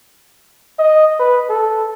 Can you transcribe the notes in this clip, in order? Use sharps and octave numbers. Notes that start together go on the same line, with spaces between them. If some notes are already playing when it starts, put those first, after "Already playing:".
D#5
B4
A4